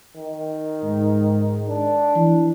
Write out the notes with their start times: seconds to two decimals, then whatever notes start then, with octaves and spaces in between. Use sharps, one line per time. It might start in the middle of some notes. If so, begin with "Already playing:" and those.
0.17 D#3
0.84 G#2
1.69 D4
2.16 E3